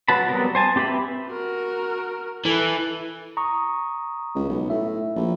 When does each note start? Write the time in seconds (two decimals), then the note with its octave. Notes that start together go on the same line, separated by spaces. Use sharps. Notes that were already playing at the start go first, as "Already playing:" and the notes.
0.08 F#3 F#4 B4 A5 B5
0.29 F#3 G3 B3 C4 A#4
0.55 C5 G#5 A5
0.76 C4 G4 B4 E5 B5
1.29 F#4 A#4
2.45 E3 A4 B4
3.37 A#5 C#6 D#6
4.35 C#2
4.49 B1
4.70 A2 E5
5.15 A#1